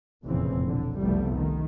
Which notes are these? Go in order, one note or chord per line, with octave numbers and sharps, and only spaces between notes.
F1 E2 A#2 C#3 E3 C4
B1 D3
F#1 C2 F2 G3 A3 B3
D#3